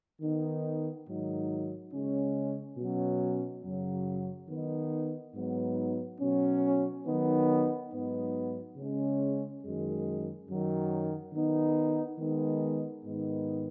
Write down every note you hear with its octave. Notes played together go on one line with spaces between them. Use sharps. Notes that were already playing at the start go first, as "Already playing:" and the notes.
D#3 B3 D#4
G#2 D#3 F#3 D#4
C#3 G#3 C#4
B2 F#3 C#4
F#2 C#3 F#3
D#3 B3 D#4
G#2 F#3 B3 D#4
B2 F#3 C#4
D#3 F#3 B3 D#4
G#2 F#3 B3 D#4
C#3 G#3 C#4
F#2 D#3 G#3
F#2 D#3 F#3
D#3 B3 D#4
D#3 G#3 B3 D#4
G#2 D#3 B3 D#4